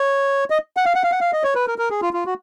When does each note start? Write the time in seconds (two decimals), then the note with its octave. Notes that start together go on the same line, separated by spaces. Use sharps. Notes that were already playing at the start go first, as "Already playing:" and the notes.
Already playing: C#5
0.50 D#5
0.77 F#5
0.85 F5
0.95 F#5
1.03 F5
1.12 F#5
1.21 F5
1.33 D#5
1.44 C#5
1.55 B4
1.67 A#4
1.78 A#4
1.90 G#4
2.02 F4
2.13 F4
2.26 F#4